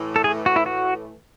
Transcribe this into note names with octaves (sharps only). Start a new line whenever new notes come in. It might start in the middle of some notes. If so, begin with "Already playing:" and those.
Already playing: A2 E3 A3
A4
G#4
F#4
E4
F#4